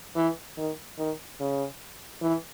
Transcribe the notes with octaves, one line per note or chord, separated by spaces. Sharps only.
E3
D#3
D#3
C#3
E3